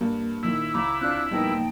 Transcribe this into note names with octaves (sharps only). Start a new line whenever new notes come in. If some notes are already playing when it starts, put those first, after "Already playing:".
G2 A#3
A#2 D#3 E4
C#2 A#5 B5 D6
C4 D4 F4 F#6
A#1 G3 A#3 B3 D#4 G5 A5
A#1 D#2